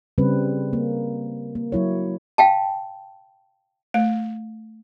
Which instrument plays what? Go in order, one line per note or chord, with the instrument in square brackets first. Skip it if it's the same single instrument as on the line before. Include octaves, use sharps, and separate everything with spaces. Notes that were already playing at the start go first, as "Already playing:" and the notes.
[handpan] C#3 G3 C4 B4
A#3
A#3
F#3 E4 C#5
[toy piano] F5 G5 A5
[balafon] A3